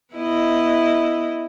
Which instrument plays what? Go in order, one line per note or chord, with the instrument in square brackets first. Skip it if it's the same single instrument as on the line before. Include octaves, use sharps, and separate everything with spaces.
[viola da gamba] B3 E4 D#5